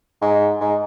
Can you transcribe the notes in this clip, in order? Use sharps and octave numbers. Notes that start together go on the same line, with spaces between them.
G#2
G#2